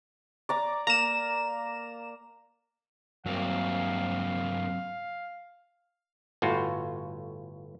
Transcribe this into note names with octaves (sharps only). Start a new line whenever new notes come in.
D5 A#5 D6
A#3 A#5 E7
G2 F#3 A#3 C4 F5
G1 A2 F4 F#4